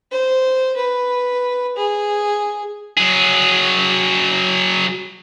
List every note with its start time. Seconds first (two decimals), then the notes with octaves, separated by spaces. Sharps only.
0.11 C5
0.76 B4
1.77 G#4
2.97 F#3 G#4